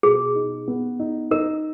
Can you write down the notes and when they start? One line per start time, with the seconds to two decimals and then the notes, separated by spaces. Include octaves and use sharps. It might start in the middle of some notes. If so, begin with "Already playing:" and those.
0.03 B2 G#4
0.35 D#4
0.68 B3
0.99 D#4
1.31 D#4 A#4